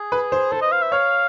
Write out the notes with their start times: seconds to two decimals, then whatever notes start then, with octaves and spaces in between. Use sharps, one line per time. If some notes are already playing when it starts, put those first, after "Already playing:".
Already playing: G#4
0.12 B4
0.32 C5
0.52 A4 C5
0.62 D#5
0.72 F5
0.82 E5
0.92 C#5 F5